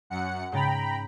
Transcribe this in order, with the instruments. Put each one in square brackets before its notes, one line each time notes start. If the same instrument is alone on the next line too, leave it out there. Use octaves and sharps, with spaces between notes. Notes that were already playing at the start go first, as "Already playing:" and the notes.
[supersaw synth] F#2 F#5 C#7
[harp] G#2 C#3 A6 [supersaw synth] G5 A#5 B5